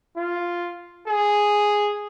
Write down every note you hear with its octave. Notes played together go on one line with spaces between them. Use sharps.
F4
G#4